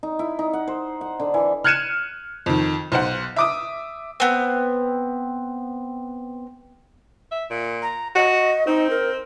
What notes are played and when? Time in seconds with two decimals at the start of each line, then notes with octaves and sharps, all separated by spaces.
0.03 D#4
0.19 E4
0.39 D#4
0.53 F#5
0.68 C5
1.01 F#5
1.20 D3
1.34 E3
1.64 F6 F#6 G#6 C#7 D#7 E7
2.46 F2 D#3
2.92 B1 C5 F#5
3.36 E5 D6 D#6
4.20 B3 C4
7.31 E5
7.51 A#2
7.82 A#5
8.16 F#4 D#5
8.67 C4 D#4
8.90 A#4